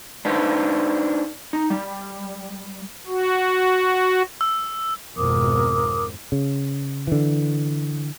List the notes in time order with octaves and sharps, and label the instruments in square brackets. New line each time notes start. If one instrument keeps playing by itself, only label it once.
[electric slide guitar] D4 D#4 B4 C5
D#4
G3
[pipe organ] F#4
[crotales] E6
[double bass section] G#1 F2 B2 [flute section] A#4 D6 D#6
[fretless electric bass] C#3
D3 E3